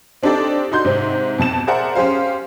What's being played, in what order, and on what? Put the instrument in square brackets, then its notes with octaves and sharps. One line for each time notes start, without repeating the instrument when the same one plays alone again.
[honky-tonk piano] C4 D4 D#4 G4 A4 D5
D#4 F#4 C6 G6
G#2 C3 C4
F2 B2 A5 E7
G#4 A#4 C5 D5 E5 F#5
C#4 G4 G#4 C5 F5